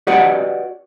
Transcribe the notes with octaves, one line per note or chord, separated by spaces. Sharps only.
F#4 G4 B4 D5 D#5 F#5